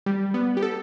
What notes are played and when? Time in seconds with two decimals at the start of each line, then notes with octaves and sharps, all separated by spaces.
0.06 G3
0.34 B3
0.57 G4
0.63 A4